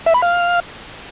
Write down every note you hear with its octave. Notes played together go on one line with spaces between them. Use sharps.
E5
B5
F5